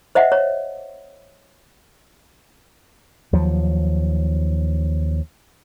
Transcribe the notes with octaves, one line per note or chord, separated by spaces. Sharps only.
C5 D#5 E5 F#5
C#5
D#2 F3 F#3